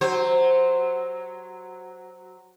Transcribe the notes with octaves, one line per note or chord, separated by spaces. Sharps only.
F#3 C5